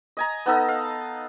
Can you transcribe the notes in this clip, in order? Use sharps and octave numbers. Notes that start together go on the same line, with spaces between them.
D#5 G#5 A#5
B3 D#4 A4 D#5
F5